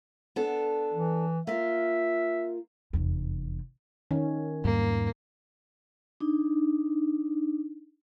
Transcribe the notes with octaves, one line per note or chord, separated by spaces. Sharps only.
B3 D4 A4
E3
A#3 F4 E5
F1 E2
D#3 C#4
E2 G#2 G3 A#3
D4 D#4